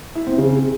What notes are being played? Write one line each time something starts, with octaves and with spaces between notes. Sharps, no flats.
E4
C4
C#3